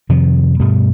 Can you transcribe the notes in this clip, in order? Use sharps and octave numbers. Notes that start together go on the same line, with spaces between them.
F2 C3 D#3 F3
G2 B2 G3 A3